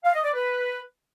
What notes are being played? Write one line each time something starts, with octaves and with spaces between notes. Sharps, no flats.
F5
D#5
D5
B4